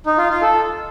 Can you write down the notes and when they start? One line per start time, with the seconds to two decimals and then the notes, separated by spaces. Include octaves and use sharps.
0.06 D#4
0.18 F4
0.30 F4
0.42 A4